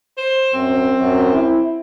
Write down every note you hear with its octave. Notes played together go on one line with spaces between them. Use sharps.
C5
F#2 C4
F#2
E4